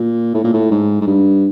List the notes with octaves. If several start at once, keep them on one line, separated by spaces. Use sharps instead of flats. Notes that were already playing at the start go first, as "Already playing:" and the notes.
Already playing: A#2
A2
A#2
A2
G#2
G#2
G2